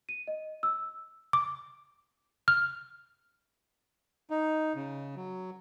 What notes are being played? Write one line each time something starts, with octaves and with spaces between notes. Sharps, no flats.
D#7
D#5
E6
D6
F6
D#4
C#3
F#3